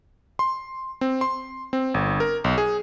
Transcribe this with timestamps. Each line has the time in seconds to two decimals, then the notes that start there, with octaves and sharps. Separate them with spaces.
0.39 C6
1.01 C4
1.21 C6
1.73 C4
1.94 G1
2.20 A#4
2.44 B1
2.58 G#4